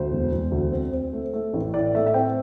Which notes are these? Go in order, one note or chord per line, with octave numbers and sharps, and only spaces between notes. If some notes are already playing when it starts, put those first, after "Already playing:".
Already playing: D2 C5
E1
E1
D2
C4
C4
A3
A3
A1
A2 D5
A3 E5
E5
C4 G5